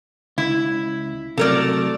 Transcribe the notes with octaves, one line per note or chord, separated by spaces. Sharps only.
C#2 E4
C3 F#3 A3 A#4 D5